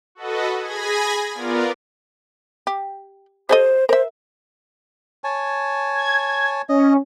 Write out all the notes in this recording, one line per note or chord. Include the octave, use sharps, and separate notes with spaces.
F#4 A4 B4 D#5
G#4 G#5 B5 G#6 A#6
B3 F4 A#4 D5
G4
G4 A4 C5 D#5
A#4 C5 E5
C#5 G#5 A5
G#6
C#4 D#5